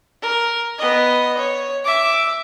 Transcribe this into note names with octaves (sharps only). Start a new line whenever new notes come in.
A#4
B3 D#5
C#5
E5 D6